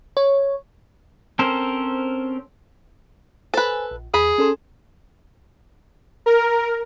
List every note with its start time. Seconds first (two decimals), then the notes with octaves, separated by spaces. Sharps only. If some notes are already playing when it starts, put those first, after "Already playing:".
0.17 C#5
1.39 C4 C#4 A4 A#4 C5
3.54 A4 B4 C5 G#5
3.91 A#1
4.14 E2 G#4 B5
4.38 C#4 A4 C6
6.26 A#4